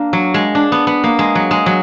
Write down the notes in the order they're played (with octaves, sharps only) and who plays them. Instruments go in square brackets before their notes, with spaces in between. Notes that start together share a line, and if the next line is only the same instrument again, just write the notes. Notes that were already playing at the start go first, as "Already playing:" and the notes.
Already playing: [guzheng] A#3 D4
F#3
G#3
D4
B3
B3
A#3
G#3
F#3
G#3
F#3